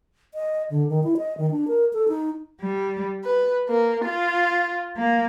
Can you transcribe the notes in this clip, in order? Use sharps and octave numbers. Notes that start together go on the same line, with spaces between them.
D#5
D3
D#3
E4
D#5
D#3
D4
A#4
A4
D#4
G3
B4
A#3
F4
A#3